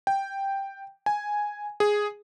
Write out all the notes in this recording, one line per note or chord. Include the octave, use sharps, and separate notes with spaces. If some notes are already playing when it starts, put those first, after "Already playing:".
G5
G#5
G#4